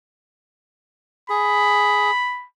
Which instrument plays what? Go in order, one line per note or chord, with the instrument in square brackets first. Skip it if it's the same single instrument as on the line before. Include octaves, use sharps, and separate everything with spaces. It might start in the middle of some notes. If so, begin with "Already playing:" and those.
[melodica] G#4 [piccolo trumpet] B5